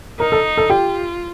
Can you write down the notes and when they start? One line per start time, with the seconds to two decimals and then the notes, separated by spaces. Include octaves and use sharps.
0.20 D#4 A#4
0.32 A4
0.57 A4
0.70 F4 G4